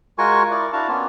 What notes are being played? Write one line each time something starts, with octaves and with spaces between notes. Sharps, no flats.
G#3 F4 F#4 A#4 G#5 C#6
E4 A#4 D5
D4 E4 F#4 F5 A5
A#3 B3 C#4 F4